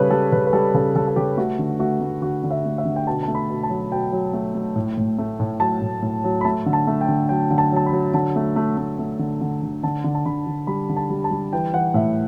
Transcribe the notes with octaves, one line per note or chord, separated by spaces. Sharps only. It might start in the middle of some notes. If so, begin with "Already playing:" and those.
Already playing: C#3 G3 A4 B4 C#5
G3 A4
C#3 B4
B4
G3 A4
C#3 A4
C#3 A4
A4
C#3 G4
A3 F#4
D3
A3 F#4
A3
D3 F#4
D3
E5
A3
E5
D3
G5
B2 A5
A3 A5
B5
B2
A5
F#3
B2 G5
F#3
A3
A3
A2
A2
A3
A2
F#3 A5
A2
A2
F#3
B5
A3 A5
D3
A5
A3
G5
D3
F#3 G5
D3
A5
F#3 A5
B5
F#3
D3 A5
A3
A3
A3
A3
D3
D3
D3
D3 A5
D3
A5
D3 B5
D3
G3 B5
D3
A5
G3
A5
G3
E3 G5
E3 F#5
A2 E5